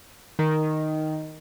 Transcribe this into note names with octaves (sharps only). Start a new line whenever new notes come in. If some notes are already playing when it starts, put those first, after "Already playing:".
D#3